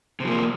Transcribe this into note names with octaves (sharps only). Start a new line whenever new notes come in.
C3 F3 A#3